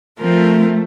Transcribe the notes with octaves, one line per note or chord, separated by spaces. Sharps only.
F3 A3 C4 F4 A#4